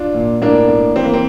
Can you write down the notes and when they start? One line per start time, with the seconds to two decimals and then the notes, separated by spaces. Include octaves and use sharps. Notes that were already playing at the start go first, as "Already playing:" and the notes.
Already playing: D4 F4
0.14 A#2
0.42 A2 A#3 D4
0.69 A2
0.96 E3 C4
1.04 A#3
1.13 C4